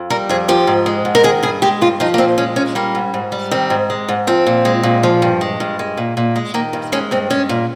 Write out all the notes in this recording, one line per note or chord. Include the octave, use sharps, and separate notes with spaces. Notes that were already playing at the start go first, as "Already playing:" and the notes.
Already playing: F2
G3 A#4
F2 G#4
F3 G4
G#2
G#3
G#2
A#4
D#3 G#4
G2 G#4
G#3 G4
G2 F4
F3 D#4
A#3
A#2 C4
G#3 C#4
A#2 C#4
G3 A#3
G#2
G#2
G3
D#3 C4
G#2
G#3
G#2
F3 C4
A#2
G#3
A#2
F3
G2
G#3
G2
G#3
A#2
A#2
G#3
D#3 A#3
G2
G#3 C#4
G2 C4
G#3 C#4
A#2